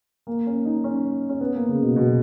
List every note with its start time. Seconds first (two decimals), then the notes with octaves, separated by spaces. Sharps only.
0.27 A#3
0.46 C#4
0.65 D#4
0.84 C#4
1.29 C#4
1.41 B3
1.55 A#3
1.69 C#3
1.83 B2
1.96 B2